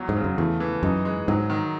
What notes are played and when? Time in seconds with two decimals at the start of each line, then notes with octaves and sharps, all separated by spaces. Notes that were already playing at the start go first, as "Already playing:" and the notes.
Already playing: E2 F#3
0.09 G#2
0.17 C#3
0.24 F#2
0.38 E2 A3
0.60 E3
0.83 F#2 D#4
1.05 G#3
1.28 G#2 F#3
1.50 D#3